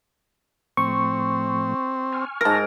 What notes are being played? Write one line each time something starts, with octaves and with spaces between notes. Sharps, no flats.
A2 F3 A3 C4 C#6
G#5 C#6 F6
G#2 A#4 A5 A#6